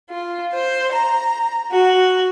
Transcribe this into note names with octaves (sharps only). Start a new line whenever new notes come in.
F4
C5
A#5
F#4